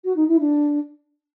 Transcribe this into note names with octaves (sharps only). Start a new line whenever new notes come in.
F#4
D#4
E4
D4